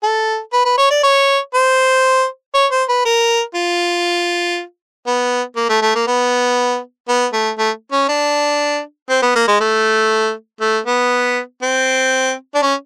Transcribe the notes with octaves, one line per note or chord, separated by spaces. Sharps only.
A4
B4
B4
C#5
D5
C#5
C5
C#5
C5
B4
A#4
F4
B3
A#3
A3
A3
A#3
B3
B3
A3
A3
C#4
D4
C4
B3
A#3
G#3
A3
A3
B3
C4
D4
C#4